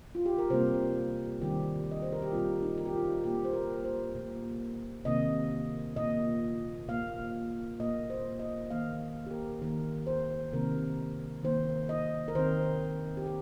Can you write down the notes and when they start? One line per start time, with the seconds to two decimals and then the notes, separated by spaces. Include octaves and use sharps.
0.15 F4
0.26 G4
0.38 A#4
0.50 C3 G3 A#3 C5
1.42 D#3 G3 C4 G4
1.91 D#5
2.02 C5
2.13 A#4
2.22 G4
2.32 A#2 G3 C4 F4
2.62 D#4
2.78 A#4
2.86 G4
2.94 F4
3.24 A#2 A#3 G4
3.45 C5
3.53 A#4
3.84 C5
4.15 A#2 A#3
5.05 C3 D#3 A#3 D#5
5.96 A#2 A#3 D#5
6.88 A#2 A#3 F5
7.79 A#2 A#3 D#5
8.10 C5
8.40 D#5
8.70 D#3 A#3 F5
9.26 G4
9.31 A#4
9.62 D#3 A#3 A#4
10.07 C5
10.53 C3 D#3 A#3 A#4
11.43 D#3 A#3 C5
11.89 D#5
12.28 A#4
12.35 D#3 C4 C5
13.17 G4
13.27 A#4